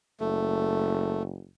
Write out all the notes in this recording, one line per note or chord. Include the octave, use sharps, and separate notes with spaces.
F#1 A3